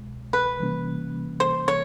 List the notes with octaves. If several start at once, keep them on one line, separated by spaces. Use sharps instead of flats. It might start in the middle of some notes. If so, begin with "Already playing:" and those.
Already playing: C2 B2 G#3
B4
C3 E3 G3 A#3 C#4
C5
C#5